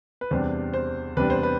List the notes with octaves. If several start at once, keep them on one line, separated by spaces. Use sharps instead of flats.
B4
E2 C3 G3 D4 C5
C5
E2 C3 G3 D4 B4
C5
B4